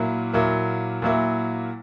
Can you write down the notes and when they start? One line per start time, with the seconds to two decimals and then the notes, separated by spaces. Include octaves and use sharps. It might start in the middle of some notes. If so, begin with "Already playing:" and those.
Already playing: A#2 F#3 A#3 E4
0.33 A#2 F#3 A#3 E4
1.02 A#2 F#3 A#3 E4